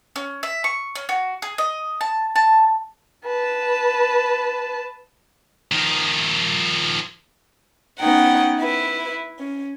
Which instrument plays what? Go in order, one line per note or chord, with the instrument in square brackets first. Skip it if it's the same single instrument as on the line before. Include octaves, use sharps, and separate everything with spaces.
[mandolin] C#4
E5
C#6
C#4
F#4
G#4
D#5
A5
A5
[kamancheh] B4 A5
[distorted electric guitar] D#3 F3
[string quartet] B3 C#4 D#4 F#5 G5
E4 B4
C#4